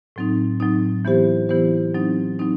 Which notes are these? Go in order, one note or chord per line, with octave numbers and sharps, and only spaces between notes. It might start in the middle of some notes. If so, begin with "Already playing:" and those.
A2 F#3 C4 D#4
A2 F#3 C4 D#4
E3 B3 E4 G4 C5
E3 B3 E4 G4 C5
F#3 C4 D#4
F#3 C4 D#4